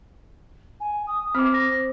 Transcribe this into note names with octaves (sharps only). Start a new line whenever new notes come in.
G#5
D#6
C4 C5 D6 F6
A#6